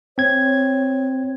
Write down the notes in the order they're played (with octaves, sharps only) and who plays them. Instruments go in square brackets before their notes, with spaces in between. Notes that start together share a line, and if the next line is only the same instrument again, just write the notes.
[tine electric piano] C4 G#6 [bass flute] C#5